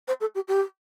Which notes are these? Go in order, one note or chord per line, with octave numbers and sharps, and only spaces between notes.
C5
A4
G4
G4